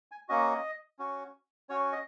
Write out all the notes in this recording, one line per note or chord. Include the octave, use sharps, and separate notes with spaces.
G#5
A#3 C#4 F#4 D#5
C#4 F#4
C#4 F#4 C#5
D#5